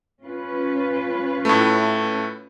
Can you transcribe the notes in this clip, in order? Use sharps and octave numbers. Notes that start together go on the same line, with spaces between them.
C#4 F4 B4
A2 A3